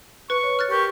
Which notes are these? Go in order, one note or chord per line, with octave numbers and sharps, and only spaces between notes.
B4 C#6
C#5
F6 F#6 A6
G4 A#4 C#6